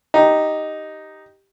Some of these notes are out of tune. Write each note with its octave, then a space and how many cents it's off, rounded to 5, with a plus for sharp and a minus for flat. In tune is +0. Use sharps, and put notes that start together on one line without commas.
D#4 +0 G4 +0